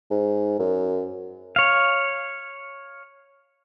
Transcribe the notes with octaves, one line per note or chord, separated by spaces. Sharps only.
G#2
F#2
C#5 F5